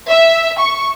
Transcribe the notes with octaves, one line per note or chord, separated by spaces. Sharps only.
E5
C#6